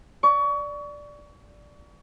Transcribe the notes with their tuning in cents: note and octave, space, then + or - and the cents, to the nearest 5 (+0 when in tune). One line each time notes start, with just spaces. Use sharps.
D5 +0 C#6 +30